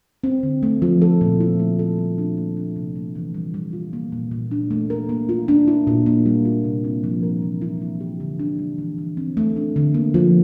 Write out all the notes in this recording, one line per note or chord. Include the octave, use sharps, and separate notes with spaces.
C4
D3
A3
F3
A4
A#2
E4
A3
A4
G3
D4
A#3
D4
C3
A3
E3
G3
G3
F4
A#3
A#2
A#2
D4
A3
A#4
A#3
F4
D4
E4
A#2
A#3
G3
F4
C3
C4
F3
A#4
E3
E4
A#3
G4
D3
D4
G3
E3
E3
C4
A3
D4
D3
A#3
F3